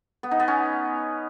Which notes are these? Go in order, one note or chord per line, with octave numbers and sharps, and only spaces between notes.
B3
D#4
B3
C#4